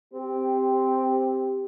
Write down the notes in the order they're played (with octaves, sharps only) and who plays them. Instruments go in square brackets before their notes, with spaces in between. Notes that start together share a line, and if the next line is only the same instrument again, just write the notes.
[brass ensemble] C4 G4